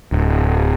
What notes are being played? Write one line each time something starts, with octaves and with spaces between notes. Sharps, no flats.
D1